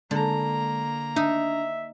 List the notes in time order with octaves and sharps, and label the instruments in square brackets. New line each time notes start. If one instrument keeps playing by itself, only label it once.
[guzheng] D3 [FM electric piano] G#3 [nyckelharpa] A#3 A#5
[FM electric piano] D4 [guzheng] D#4 [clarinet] E5